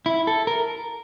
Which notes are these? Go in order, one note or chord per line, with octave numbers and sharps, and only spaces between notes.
E4
A4
A#4